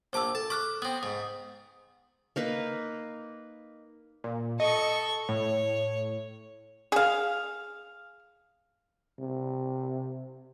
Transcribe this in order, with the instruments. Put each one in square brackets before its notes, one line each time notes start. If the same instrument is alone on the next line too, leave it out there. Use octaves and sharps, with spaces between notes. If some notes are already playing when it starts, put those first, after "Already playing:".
[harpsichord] A#1 D6 [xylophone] C5 A5 E6
[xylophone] A4 [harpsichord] A5
[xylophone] C#6 F6 F#6 [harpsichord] D6
[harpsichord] B3 C4 [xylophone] D#6
[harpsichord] G#2 [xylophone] D#6
[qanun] A#3 D#4 B4
[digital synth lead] A#2
[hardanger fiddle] A4 C#6 [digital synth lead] D#5
[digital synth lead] A2 [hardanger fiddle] C#5
[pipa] G#4 F5
[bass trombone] C3